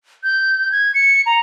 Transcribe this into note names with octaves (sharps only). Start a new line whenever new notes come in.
G6
G#6
C#7
A#5